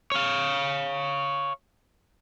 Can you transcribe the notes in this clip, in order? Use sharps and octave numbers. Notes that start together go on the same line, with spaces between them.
C#5 F5